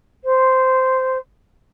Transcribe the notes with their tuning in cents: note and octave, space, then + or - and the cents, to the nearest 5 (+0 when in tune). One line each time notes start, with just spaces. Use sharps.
C5 -10